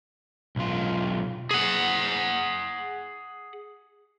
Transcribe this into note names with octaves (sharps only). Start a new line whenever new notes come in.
B1 F4
G#4 F#5